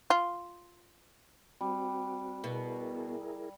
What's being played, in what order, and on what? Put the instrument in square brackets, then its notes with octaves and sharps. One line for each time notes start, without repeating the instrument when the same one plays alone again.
[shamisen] F4
[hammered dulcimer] G3 [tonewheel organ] C4 F#4
[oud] B2 [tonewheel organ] E4 G#4 A#4